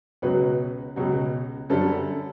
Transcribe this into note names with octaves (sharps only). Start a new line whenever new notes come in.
C#2 B2 F#3 B4
C#2 B2 F#3
F#2 D3 G3 A4